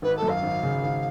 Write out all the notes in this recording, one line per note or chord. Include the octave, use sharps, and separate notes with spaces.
G#1 B4
A4
F#2
F5
G#1
C#3
G#1